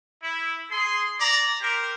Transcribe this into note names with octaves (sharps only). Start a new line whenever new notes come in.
E4
G#4 C6
D5 A#5
G4 A#4 C5